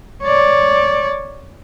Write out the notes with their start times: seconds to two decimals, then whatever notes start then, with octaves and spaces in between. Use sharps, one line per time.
0.24 C#5 D5